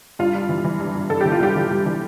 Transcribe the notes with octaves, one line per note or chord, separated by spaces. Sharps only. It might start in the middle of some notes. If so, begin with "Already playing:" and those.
G2 F4
G2
E3
E3
G2
G2
G2 A4
E3 G4
F4
G2 G4
E3
G2
E3